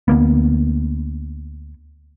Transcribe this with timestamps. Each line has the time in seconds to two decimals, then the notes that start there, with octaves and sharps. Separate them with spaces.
0.08 D2 A#3 B3